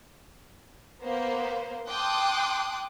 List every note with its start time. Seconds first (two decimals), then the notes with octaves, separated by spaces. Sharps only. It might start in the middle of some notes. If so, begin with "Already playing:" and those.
1.02 A#3 B3 C5
1.87 G5 A5 C6 D6 D#6 F#6